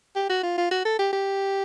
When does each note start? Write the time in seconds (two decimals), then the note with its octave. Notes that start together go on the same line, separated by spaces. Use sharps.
0.15 G4
0.30 F#4
0.43 F4
0.58 F4
0.71 F#4
0.85 A4
0.99 G4
1.13 G4